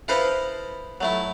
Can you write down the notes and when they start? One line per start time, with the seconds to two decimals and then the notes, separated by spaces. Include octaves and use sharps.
0.08 E4 A4 B4 C5 D#5 F5
1.01 F#3 A3 E4